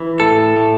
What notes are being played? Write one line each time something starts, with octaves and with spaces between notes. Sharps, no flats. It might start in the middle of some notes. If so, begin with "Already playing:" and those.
Already playing: E3
A2 A4
A2